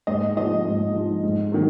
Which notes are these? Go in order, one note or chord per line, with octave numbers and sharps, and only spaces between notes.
G#2 D#5
F3 D#5
G#2
F3
G#2
D#3 F#3